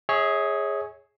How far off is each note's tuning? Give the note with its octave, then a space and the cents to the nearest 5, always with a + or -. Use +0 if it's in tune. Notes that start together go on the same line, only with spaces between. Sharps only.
G#4 +0 C#5 +0 E5 -40